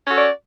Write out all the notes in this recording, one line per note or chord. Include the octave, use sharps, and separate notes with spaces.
C#4 F#4 A4 D5